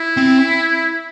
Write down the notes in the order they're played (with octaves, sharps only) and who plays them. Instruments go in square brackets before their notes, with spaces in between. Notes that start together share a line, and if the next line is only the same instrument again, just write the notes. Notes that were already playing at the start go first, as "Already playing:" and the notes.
Already playing: [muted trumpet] E4
[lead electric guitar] C4